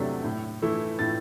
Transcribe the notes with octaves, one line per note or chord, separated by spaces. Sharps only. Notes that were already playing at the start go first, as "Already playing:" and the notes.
Already playing: E2 C3 F#3 A3 D4 A6 B6
A2
E3 A3 E4
A2 A6